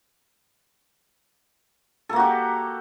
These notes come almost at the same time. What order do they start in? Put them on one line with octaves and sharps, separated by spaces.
A4 A#3 F#4 G4